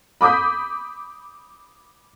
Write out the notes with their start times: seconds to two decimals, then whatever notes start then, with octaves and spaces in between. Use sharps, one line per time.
0.21 B5 D6 D#6 G6 B6